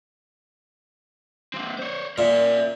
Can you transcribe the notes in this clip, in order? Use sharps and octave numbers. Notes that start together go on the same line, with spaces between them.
A#3 C4
C5 C#5
A#2 A#4 E5